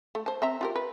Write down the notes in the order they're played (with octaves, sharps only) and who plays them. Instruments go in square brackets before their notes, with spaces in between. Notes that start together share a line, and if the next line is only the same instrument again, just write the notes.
[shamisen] A3
C5 A5
C4 E5 A#5
F4 G4 A#4
B4